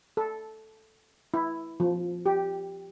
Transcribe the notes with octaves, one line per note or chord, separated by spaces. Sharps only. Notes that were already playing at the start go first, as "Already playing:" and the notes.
A4
E4
F3
G4